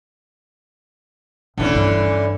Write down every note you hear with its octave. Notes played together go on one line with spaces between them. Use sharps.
D#1 D3 E3 C4 C#4
G2